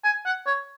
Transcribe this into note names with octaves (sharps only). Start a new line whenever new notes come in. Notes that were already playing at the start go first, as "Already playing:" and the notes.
G#5
F#5
C#5